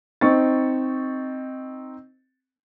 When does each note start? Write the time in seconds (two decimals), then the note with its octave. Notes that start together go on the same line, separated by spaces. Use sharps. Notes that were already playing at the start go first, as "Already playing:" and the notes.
0.21 C4 D#4 C#6 A6